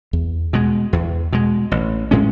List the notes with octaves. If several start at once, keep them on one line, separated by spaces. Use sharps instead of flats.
E2
B2 G#3
E2
B2 G#3
A1
A2 G#3 C#4